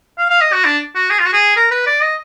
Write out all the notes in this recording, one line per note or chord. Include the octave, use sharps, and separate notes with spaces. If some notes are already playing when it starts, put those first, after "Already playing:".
F5
F5
D#5
F#4
D4
F#4
G#4
F4
F#4
G#4
A#4
B4
D5
D#5